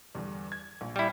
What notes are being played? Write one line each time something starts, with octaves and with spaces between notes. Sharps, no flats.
E2 G2 D3
G#6
A#1
G3 E4